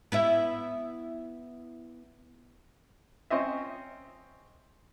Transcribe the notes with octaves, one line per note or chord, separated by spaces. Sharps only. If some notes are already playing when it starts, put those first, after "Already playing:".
B3 E4 E5
C4 C#4 D#5 E5